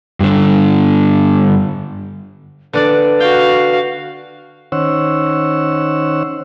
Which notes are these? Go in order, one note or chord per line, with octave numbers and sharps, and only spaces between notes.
G2 D3
D3 D4 B4 D5
F#4 F5 G5
D#3 C#4 C5 C#5 F#5 E6